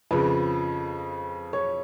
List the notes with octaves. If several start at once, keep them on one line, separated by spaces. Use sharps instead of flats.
F2 C#3 B4
C#5